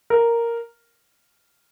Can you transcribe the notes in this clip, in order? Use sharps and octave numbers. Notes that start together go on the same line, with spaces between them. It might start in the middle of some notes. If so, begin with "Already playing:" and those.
A#4